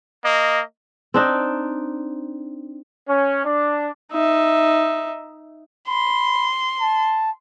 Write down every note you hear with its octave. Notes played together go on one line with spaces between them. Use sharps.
A#3 D#5
C4 D4 D#4
C#4
D4
D#4 E5
B5 C6
A5